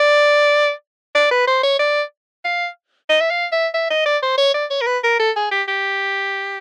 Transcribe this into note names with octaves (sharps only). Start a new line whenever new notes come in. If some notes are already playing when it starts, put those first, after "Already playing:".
Already playing: D5
D5
B4
C5
C#5
D5
F5
D#5
E5
F5
E5
E5
D#5
D5
C5
C#5
D5
C#5
A#4
B4
A#4
A4
G#4
G4
G4